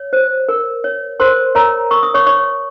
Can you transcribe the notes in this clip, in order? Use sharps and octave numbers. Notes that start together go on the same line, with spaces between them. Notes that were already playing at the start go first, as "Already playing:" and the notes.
Already playing: C#5
C5
A#4
C#5
A#4 C5 C6
A#4 C#5 A#5
A#4 C#6
D#6
C#5 C#6
C#5 C#6